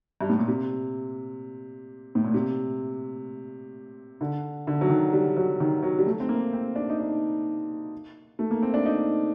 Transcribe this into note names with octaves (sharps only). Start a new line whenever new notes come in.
G2
A2
A#2
C3
A2
A#2
C3
D3
D3
F#3
D#3
G3
F#3
D#3
F#3
G3
A3
C4
A#3
C4
D4
D#4
D4
A3
A#3
C4
D4
D#4